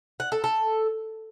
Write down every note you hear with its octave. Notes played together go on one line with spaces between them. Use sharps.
F#5
A4
A4